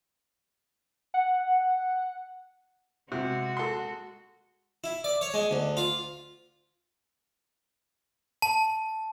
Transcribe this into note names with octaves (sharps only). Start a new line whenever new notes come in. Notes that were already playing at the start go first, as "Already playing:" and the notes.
F#5
C3 G#3 F#4
A4 C6
E4
D5
C#5
G#3
D2
F4
A5